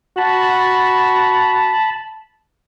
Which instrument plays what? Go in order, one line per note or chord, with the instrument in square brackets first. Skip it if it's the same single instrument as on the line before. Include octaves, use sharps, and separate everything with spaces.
[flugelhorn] F#4 [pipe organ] A5 B5